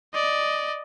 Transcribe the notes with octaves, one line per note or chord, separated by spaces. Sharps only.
D5 D#5